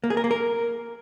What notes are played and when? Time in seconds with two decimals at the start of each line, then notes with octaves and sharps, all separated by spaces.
0.04 A#3
0.10 G#4
0.17 A#4
0.24 A#3
0.31 A#4